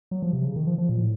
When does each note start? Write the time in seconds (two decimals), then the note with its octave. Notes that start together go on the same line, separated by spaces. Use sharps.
0.11 F#3
0.22 F3
0.33 C3
0.45 C#3
0.56 D#3
0.67 F3
0.78 F3
0.89 A#2
1.00 A2